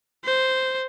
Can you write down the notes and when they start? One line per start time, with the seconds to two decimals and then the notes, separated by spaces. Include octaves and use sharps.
0.24 C5